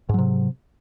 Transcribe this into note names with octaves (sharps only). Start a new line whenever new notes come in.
G#2 C3 F#3